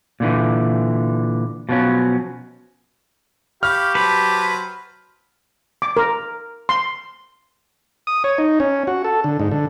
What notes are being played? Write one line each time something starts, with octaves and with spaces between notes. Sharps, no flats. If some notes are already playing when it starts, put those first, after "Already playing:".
A#2 D3 E3
B2 F3 F#3 C#4
G4 F5 B5 C#6 F6
F#3 B4 C5 A5
D6
A#4
C6
D#6
C#5
D#4
C#4
F#4
A4
D3
G#2
D3